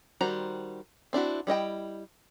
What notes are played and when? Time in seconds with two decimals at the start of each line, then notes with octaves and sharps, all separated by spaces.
0.21 D#3 G3 F#4 C5 A#5
1.13 C4 D4 E4 F#4
1.47 G3 E4 D#5 G5